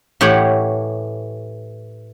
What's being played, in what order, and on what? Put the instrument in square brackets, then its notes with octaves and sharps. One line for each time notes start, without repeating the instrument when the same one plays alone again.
[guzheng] A2 E3 G4 C#5 F#5